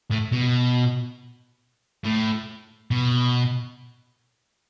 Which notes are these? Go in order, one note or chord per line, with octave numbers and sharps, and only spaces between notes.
A2
B2
A2
B2